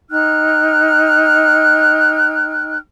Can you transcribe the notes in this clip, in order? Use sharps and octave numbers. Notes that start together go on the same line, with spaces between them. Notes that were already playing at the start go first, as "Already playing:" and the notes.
D#4 G5 F6 F#6